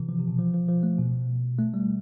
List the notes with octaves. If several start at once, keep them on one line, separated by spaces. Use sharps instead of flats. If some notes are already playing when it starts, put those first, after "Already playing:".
Already playing: C3 E3
F3
C3
B2
F3
F3
F3
A3
B2
A3
G3